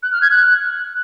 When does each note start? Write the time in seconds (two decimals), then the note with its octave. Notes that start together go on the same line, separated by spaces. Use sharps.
0.03 F#6
0.12 F6
0.22 G#6
0.31 F#6